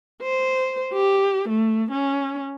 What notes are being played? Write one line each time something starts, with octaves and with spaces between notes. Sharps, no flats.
C5
G4
A3
C#4